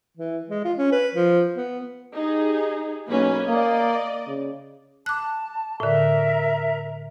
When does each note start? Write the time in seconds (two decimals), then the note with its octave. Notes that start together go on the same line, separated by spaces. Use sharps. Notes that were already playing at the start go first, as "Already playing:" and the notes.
0.17 E3
0.49 G#3
0.64 F4
0.78 C#4
0.92 B4
1.14 F3
1.55 B3
2.16 D#4 G4 G#4
3.09 B1 A#3 C#4 B4
3.48 A#3 D5 D#5
4.27 C#3
5.06 A5 D6 F#6
5.80 A2 D3 A#4 E5 A#5